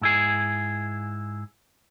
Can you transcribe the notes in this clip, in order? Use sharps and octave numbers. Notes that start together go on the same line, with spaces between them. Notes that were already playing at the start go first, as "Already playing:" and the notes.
G#2 E4 G#4